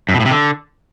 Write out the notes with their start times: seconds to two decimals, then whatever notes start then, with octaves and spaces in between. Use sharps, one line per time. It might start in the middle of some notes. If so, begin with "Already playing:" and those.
0.09 F#2
0.14 B2
0.20 A2
0.25 C3
0.31 D3